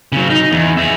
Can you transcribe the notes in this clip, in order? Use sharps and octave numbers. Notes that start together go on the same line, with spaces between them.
C#3 F#3
D#4
E2
G#4 E5